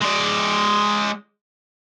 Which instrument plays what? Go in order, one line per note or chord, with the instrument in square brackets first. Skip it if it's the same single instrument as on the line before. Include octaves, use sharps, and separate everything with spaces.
[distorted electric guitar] G#3 D5